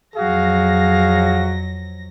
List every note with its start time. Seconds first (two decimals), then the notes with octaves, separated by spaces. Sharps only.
0.16 F2 F#3 F#4 G#4 F5 A#6